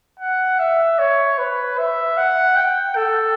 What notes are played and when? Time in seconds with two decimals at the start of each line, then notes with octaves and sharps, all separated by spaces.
0.20 F#5
0.59 E5
0.99 C#5
1.38 B4
1.78 E5
2.17 F#5
2.56 G5
2.96 A4